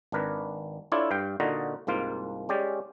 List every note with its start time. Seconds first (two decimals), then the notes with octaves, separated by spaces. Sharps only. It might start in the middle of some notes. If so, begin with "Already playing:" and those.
0.12 G#1 D4 A#4 B4
0.92 D4 E4 F4 A4 C#5 D5
1.11 G2 F5 G5
1.40 A#2 D3 D#4 F4 F#4 D#5
1.87 C2 G#2 A#3 F4
2.49 G#3 C#4 G4 D5